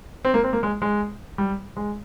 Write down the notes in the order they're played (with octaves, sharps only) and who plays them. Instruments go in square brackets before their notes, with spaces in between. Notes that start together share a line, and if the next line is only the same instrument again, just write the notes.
[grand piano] C4
A#3
C4
A#3
G#3
G#3
G3
G#3